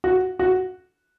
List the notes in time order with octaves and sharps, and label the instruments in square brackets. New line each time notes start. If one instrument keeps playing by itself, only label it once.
[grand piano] F#4
F#4